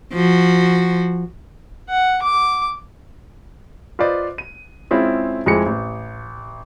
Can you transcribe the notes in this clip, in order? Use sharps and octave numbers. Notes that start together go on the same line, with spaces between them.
F3 F#4
F#5
D6
F4 B4 C5 D5 D#5
D#7
G#3 C4 C#4 E4 F4 G#4
F1 F2 G#3 E4 G#4 C#7
A1